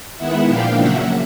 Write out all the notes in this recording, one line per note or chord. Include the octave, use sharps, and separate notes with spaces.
D#3 G#3 B3 E4 E5 F#5
A#2 F3 A#3 D4 F5 G5
C#3 F#3 A#3 E5 F#5